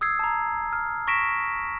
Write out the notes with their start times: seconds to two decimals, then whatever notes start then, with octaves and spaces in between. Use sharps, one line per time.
0.01 D#6 E6 G#6 C7
0.19 A5 A#5
0.73 F6
1.07 C#6 A#6 B6 D7 E7